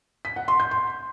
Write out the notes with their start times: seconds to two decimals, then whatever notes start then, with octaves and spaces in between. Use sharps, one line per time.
0.25 B6
0.36 F#5
0.48 C6
0.60 G6
0.71 C6